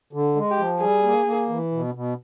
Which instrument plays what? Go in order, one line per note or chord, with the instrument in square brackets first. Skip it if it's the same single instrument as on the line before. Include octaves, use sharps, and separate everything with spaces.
[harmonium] D3
G#3
[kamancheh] G4
[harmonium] F3
[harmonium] G3 [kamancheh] G#4
[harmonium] A#3
A#3
E3
B2
B2